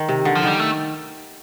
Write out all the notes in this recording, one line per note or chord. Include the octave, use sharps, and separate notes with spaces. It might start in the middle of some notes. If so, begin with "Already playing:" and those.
Already playing: D#3
C3
D3
F3
D#3 G3
A3